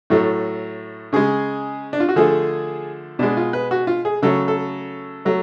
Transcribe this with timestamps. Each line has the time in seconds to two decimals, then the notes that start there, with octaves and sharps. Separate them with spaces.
0.10 A2 F#3 A3
1.13 C#3 G#3 G#4
1.93 D4
2.00 F4
2.09 F#4
2.16 D3 F3 A3 G#4
3.19 B2 G#3 D4
3.37 F4
3.53 B4
3.71 F#4
3.87 F4
4.05 G#4
4.22 C#3 F#3 A3 A4
4.48 A4
5.25 F#3 A3